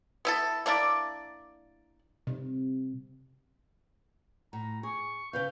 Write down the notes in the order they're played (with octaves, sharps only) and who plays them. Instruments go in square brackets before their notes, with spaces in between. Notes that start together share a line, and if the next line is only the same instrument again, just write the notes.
[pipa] B3 E4 A4
A#3 D4 E4 D5
[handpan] C3
[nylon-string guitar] A2 [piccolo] A#5
[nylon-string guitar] G#4 [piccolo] C#6
[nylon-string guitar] C#3 B4 F5 [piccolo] G6